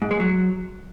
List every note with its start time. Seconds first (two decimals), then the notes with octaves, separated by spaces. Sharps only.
0.02 G#2
0.11 G#3
0.20 F#3